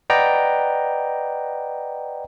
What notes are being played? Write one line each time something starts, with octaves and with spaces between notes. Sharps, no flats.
B4 D5 D#5 F#5 G5 A#5